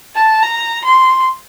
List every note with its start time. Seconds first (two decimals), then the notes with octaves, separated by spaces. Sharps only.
0.15 A5
0.43 A#5
0.85 C6